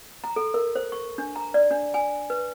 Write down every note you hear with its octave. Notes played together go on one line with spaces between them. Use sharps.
A#5
A4
A#4
C5
C#6
D4
A#5
D5
D4
G#5
B4